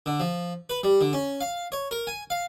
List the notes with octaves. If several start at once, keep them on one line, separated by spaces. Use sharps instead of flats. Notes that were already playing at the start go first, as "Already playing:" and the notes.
D3
F3
B4
G3
D3
C#4
F5
C#5
A#4
G#5
F5